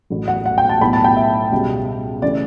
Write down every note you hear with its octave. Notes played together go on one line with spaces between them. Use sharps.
A1 A2 F#3
F#5
F#5
G5
A5
B1 A2 E3 B5
A5
G5
E5
C#2 B2 G3
C#3 E3 A3 C#4 D5